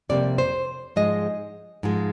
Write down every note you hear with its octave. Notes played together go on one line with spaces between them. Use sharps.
F2 C3 G3 A#3 D5
C5
G#2 F3 G#3 D#5
G#2 F3 G#3